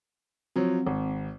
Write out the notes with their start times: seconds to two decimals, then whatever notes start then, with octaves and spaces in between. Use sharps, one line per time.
0.56 F3 F#3 C4
0.87 G#1